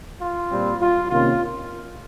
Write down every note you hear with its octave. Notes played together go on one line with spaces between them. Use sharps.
F4
A#2 G3 C4
F4
C3 D#3 A#3 C#4 F4